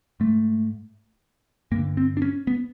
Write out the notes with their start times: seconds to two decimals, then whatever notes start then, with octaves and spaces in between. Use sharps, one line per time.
0.20 G#2 A3
1.71 G2 A#3
1.76 D3
1.97 C4
2.17 D4
2.22 C#4
2.47 B3